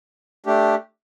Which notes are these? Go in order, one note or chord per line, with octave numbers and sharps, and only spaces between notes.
A3 D4 G4